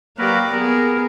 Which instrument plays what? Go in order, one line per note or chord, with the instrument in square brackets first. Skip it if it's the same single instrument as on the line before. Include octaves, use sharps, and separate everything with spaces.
[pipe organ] F#3 A#4 B4 [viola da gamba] A#3 G4 D5
[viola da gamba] B3 G#4 [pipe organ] A#4